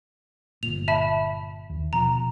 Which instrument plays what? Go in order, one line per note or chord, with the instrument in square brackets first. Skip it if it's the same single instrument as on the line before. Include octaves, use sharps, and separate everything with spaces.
[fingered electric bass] G1 A#2 [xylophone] F7
[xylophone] E5 A5 B5
[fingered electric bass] D#2
[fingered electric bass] B2 F3 [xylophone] A#5